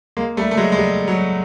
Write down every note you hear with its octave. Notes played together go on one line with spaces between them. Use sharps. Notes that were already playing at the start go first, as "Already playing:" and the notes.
G#3 A#3
G3 A3
A3
F#3 G#3
G#3
G3
F#3